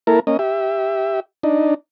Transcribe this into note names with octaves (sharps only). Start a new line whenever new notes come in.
A#3 E4 A4 A#4
A#3 C#4 D#5
G4 E5
D4 D#4